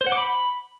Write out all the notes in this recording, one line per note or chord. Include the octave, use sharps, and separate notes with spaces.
C5
F#5
D6
B5